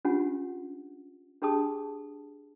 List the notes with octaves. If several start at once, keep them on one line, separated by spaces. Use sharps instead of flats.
C#4 D4 F4 G4 F#5 G#5
D4 G4 G#4 G5 A5 D#6